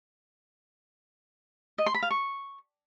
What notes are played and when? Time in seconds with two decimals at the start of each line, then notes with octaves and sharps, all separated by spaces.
1.78 D#5
1.86 C6
1.94 B5
2.02 F5
2.11 C#6